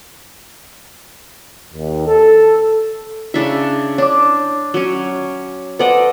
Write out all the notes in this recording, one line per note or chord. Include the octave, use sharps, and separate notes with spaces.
D#2
A4
C#3 D4 E4 E5
D4 C#5 D6
F#3 C#4
A4 B4 C5 D5 D#5 F#5